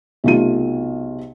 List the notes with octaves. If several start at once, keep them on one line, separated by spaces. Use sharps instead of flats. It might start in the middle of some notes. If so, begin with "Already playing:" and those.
B1 C3 A3 F4 D#7